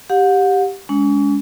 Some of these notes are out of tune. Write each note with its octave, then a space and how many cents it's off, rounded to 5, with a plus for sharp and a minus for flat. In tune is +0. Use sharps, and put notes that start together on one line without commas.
G4 +0 F#5 -35
G#3 +0 C#4 +40